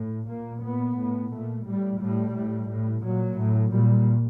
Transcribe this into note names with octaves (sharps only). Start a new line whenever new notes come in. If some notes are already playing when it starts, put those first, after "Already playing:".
Already playing: A2
A#2 A#3
A#2 B3
A2
A#2 A3
A2 G3
A2 G3
A2
A2
A#2 F#3
A2
A#2 G3